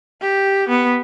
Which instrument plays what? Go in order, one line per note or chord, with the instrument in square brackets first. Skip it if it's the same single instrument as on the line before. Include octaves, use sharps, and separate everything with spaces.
[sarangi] G4
B3